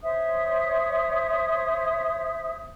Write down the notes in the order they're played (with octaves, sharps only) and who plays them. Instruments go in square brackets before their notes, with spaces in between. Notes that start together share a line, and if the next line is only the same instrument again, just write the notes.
[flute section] C5 C#5 E5 D#6